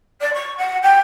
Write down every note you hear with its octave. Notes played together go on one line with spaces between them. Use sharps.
D5
C#6
F#5
G5